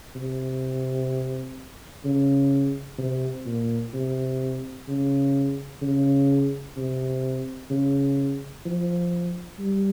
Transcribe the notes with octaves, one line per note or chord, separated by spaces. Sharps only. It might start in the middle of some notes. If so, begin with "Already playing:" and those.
C3
C#3
C3
A#2
C3
C#3
C#3
C3
C#3
F3
G3